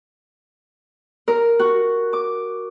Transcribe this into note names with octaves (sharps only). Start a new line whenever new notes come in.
A#4
F#4
D6